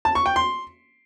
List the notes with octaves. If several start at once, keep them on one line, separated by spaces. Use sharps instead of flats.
A5
C#6
G5
C6